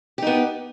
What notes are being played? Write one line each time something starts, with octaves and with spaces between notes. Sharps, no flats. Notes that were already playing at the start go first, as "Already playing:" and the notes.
B3 D#4 G4